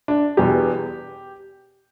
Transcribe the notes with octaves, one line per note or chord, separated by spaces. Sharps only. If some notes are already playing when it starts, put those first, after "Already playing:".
D4
E1 E2 B2 G4